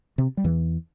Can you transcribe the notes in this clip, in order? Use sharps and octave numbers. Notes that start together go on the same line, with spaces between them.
C3 C4
G3
E2 E3